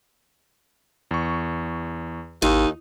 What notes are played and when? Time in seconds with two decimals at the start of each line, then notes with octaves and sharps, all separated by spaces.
1.11 E2 C#6
2.42 G#1 D#2 D#4